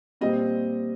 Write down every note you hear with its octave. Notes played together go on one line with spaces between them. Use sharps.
A#2 G3 C4 D#5